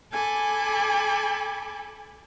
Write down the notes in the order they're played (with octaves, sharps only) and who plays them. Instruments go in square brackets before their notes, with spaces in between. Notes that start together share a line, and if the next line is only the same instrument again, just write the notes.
[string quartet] A4 G#5 B5 D6